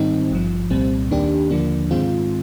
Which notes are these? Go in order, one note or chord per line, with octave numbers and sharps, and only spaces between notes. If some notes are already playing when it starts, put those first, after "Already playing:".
Already playing: G#2 D#3 G3 C4 D#4
G#1 G2 F3
C2 A#2 G3 C4
D#2 D#3 A#3 D4 G4
D#2 D3 F3 A#3 D4
G#2 D#3 G#3 C4 F4